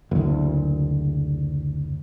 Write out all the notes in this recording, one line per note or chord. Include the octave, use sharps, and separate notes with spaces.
F#1 D2